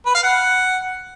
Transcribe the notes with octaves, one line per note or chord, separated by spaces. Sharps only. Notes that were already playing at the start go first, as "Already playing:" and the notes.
B4
F5
F#5